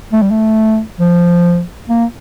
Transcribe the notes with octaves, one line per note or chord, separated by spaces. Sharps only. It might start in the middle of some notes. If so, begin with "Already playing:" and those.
A3
G3
A3
F3
A#3